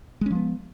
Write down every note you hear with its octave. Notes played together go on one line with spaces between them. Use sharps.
F3 G#3 B3 C#4